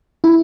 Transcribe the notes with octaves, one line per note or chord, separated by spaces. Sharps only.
E4